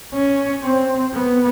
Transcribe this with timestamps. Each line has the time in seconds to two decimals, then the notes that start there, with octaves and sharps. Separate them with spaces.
0.14 C#4
0.63 C4
1.13 B3